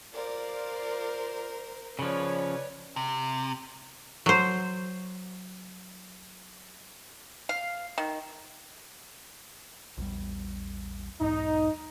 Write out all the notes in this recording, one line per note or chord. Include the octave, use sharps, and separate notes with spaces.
F4 A#4 C5 D5
C#3 F3 B4 C#5 D5
C3
F#3 C5
F5
D#3
A#1 E2 G3
B1 E2 G#2 D#4